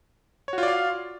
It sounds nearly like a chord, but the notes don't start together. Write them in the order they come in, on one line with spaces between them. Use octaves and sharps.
C#5 F#4 F4 D5 F5